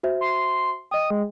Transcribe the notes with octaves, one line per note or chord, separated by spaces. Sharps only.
F#4 C5 E5
C6
D#5 G5 D#6
G#3